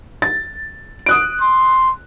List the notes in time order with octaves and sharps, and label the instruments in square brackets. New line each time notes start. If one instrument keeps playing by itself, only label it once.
[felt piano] A6
D#6 F#6 D7
[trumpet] C6